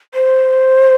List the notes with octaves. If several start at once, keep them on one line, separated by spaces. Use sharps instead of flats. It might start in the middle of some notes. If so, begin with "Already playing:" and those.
C5